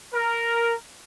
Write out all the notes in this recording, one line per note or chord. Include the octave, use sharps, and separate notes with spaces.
A#4